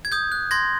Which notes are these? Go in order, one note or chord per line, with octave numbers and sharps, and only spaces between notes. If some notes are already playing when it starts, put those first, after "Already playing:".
G#6
D#6 G6
F#6
C6 G#6 A#6